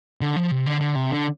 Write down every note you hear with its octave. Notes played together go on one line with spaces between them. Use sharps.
D3
F3
C3
D3
D3
C3
D3